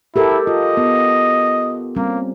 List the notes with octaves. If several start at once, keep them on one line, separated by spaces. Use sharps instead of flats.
E4 G4 A4 A#4
F4 D#5
B3
G3 A#3 C4 C#4